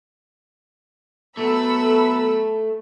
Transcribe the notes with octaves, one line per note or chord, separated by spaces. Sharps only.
F#3 A3 B3 A4 B5 E6